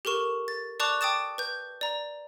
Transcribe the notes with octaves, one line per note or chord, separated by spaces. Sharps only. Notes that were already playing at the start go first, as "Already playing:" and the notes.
G4 A4 A#4 C#6 E7
A6
D5 A5 C#6 D6 F#6 F7
G5 A5 D6 D#6 A6 E7
B4 G6
D5 A#5